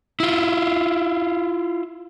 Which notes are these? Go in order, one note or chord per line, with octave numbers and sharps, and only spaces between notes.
E4 F4